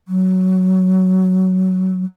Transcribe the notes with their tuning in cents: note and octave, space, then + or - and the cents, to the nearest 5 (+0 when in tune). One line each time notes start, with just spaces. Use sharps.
F#3 +10